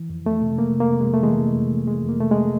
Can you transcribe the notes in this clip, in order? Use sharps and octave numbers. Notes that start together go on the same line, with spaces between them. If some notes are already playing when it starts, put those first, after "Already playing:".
Already playing: E3
F2
F2 A3
C3
F2 A#3
C3
A#3
C3
G#3
F2
A3
E3 G#3
C3
F2
E3
F2 G#3
F2 A#3
C3 A3
G#3